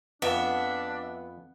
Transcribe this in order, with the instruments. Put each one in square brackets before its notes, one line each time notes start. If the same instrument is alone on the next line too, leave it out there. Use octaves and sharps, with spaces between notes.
[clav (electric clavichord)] F2 [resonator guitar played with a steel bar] B3 [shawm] D4 [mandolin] E5